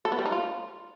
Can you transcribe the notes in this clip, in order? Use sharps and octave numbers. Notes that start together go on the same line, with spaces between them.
A4
B3
G3
D#4
F4